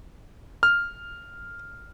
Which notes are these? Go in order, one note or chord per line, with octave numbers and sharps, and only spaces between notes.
F6